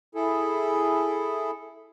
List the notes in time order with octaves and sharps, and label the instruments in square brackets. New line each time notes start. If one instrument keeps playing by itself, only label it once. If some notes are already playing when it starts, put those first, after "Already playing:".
[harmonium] E4 G#4 A4